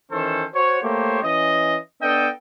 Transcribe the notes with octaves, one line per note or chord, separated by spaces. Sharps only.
D#3 E3 C#4 A4 C5
F#4 C5 C#5
A3 A#3 G4 C5 C#5
E3 C#4 D#5
B3 D4 A4 D#5 G5